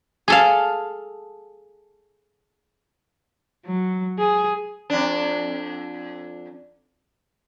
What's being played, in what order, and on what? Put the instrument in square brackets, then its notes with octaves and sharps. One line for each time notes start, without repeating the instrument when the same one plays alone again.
[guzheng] G#4 A4 F5
[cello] F#3
G#4
[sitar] F2 D4